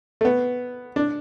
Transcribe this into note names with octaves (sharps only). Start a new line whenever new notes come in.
A3
B3
D4